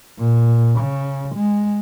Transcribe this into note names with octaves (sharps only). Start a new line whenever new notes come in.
A#2
C#3
G#3